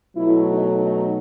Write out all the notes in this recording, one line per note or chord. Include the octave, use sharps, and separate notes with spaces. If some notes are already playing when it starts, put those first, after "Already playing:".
B2 F#3 A3 E4
D#4
D#4